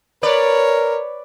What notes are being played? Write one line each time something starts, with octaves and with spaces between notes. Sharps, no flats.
A#4 B4 C#5 D5